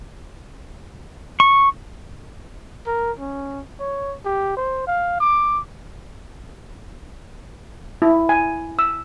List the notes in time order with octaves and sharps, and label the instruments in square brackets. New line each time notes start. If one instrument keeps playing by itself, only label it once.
[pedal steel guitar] C#6
[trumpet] A#4
C#4
C#5
G4
C5
F5
D6
[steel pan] E4
G#5
E6